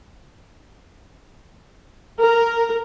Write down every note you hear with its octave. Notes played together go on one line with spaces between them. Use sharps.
A#4